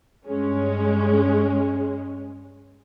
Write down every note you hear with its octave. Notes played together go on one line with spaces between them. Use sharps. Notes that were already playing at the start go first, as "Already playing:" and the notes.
G2 G#3 C#4